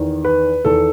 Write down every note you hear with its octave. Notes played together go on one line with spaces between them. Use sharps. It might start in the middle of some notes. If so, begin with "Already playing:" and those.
Already playing: E2 D#3
B4
E2 D#3 A4